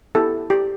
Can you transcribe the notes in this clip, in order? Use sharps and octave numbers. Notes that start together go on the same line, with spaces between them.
B3 E4 G4 A4
G4